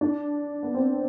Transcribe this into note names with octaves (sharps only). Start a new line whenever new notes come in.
D4
B3
C4